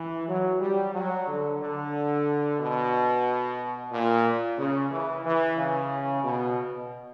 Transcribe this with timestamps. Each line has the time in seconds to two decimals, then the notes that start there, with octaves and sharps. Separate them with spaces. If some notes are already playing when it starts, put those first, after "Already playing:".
Already playing: E3
0.28 F#3
0.60 G3
0.93 F#3
1.26 D3
1.59 D3
2.59 B2
3.91 A#2
4.57 C#3
4.90 E3
5.24 E3
5.56 C#3
6.23 B2